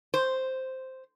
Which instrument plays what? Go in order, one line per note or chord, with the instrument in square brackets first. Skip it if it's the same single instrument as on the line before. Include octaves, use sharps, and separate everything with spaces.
[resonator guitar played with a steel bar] C5